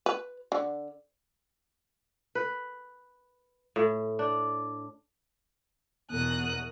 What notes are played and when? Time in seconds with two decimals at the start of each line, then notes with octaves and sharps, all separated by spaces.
0.06 B4
0.52 D3
2.35 B4
3.76 A2
4.19 D4
6.11 E2 B2 A#4 D#6 F#6